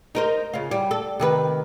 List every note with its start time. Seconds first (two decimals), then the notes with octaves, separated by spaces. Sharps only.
0.15 D#4 A#4 C5
0.54 C#3 F4
0.71 G3
0.91 A4
1.20 C3 D#3 B4